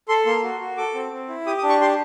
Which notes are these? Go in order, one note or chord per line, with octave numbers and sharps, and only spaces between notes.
A4 C6
A#3 C6
F#4
F#4
A4 D6
C4
C4
E4
G4 D#6
D#6
D4
C#6
G4 C6